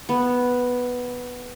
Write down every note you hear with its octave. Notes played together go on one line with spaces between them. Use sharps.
B3